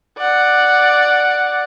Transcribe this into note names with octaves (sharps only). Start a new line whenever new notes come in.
D5 F#5